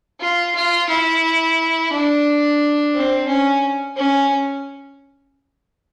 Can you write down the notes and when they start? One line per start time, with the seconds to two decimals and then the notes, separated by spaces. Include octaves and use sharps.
0.20 F4
0.55 F4
0.89 E4
1.92 D4
2.94 C4
3.28 C#4
3.96 C#4